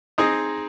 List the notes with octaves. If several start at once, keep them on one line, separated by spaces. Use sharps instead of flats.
C4 D#4 G#4 D#5